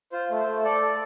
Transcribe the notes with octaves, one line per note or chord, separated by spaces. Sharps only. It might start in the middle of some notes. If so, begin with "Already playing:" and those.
F4 C5
A3
C5
A3
A4 D5
A4